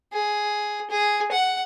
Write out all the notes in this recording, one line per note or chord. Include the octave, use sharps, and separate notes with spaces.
G#4
G#4
F#5